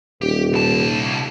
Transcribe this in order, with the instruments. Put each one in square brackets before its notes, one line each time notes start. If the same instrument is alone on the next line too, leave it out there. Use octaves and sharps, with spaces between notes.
[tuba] D#1 [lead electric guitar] G4
[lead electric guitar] C2 A5